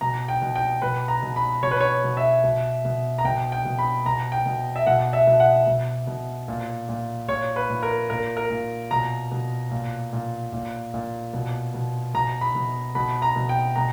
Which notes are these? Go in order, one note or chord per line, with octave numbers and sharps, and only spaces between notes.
B2 A#5
G5
B2
G5
B2 B4
A#5
B2
B5
B2 C#5
B4
C#5
B2
E5
B2
B2
A#5
B2 G5
G5
B2
B5
B2 A#5
G5
B2
E5
B2 F#5
E5
B2
F#5
B2
B2
A#2
A#2
A#2 C#5
B4
A#2
A#4
A#2 A#4
A#4
A#2
B2 A#5
B2
A#2
A#2
A#2
A#2
B2
B2
B2 A#5
B5
B2
B2 B5
A#5
B2
G5
B2 A#5